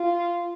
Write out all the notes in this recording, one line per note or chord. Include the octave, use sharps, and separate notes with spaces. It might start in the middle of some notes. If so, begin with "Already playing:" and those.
Already playing: F4